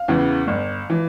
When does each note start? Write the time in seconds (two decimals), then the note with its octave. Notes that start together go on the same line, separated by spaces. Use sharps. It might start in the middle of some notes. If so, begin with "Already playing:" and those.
Already playing: F5
0.08 E2 C#3 E3
0.47 G1
0.90 E3